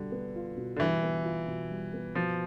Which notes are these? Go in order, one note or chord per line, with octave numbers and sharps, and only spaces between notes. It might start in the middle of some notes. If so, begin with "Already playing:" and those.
Already playing: B2 D3 G3
B3
F4
B2
D3
E3 G3
B3
F4
B2
G3
B3
B2 F3